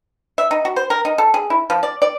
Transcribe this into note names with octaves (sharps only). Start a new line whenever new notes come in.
E5
D#4
F#4
C5
A#4
D#4
A4
G#4
E4
F3
D5
D5